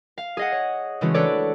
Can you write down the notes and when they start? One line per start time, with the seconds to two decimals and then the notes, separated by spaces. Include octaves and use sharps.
0.18 F5
0.37 G#4 D#5 F#5
0.52 C#5
1.01 C#3 E3 G#3 A3 C#4 F#4
1.14 D4 A4 B4 C#5 D5